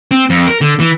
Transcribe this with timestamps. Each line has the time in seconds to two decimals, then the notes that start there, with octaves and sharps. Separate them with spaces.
0.11 C4
0.30 F2
0.47 A#4
0.61 D3
0.80 E3